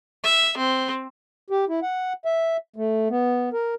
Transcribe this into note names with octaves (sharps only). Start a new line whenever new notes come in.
E5
C4
G4
E4
F#5
E5
A3
B3
A#4